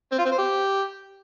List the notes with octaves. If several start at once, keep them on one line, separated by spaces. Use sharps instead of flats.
C4
F4
C4
C5
G4